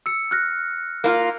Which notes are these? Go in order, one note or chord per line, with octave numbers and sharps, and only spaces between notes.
E6 C#7
F6 F#6 A#6
A#3 E4 F4